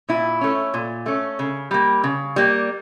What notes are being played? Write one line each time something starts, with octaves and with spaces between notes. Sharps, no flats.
A#2 E4
A3 C#4
A#2
A3 C#4
C#3
G3 A#3
C#3
G3 A#3